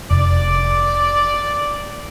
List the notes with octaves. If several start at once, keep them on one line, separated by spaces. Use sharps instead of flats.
F1 D5